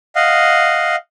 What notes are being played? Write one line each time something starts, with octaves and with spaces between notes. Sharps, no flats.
D#5 F5 F#5